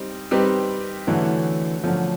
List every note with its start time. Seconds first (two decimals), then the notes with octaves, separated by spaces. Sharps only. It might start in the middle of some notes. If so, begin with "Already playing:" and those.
Already playing: G3 C4 D#4
0.31 G3 C4 D#4 G4 B4
1.07 D3 E3 F#3 A3 C#4
1.84 D3 F3 F#3 A3 C#4